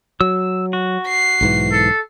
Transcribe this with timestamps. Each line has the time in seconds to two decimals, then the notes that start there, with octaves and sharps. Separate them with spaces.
0.21 F#3 E6
0.73 F#4
1.08 C7
1.41 B1 G#2 E3
1.71 A4